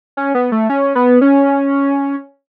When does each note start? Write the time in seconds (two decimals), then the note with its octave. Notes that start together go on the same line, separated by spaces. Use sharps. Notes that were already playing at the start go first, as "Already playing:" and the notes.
0.17 C#4
0.35 B3
0.52 A3
0.70 C#4
0.95 B3
1.21 C#4